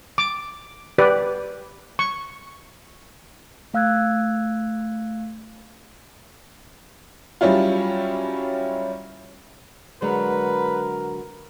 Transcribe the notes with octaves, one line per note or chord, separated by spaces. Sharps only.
D6
G4 B4 D5
C#6
A3 F5 E6 F#6 G#6
F#3 G3 C#4 E4 F4
D3 F#3 G#3 A#4 B4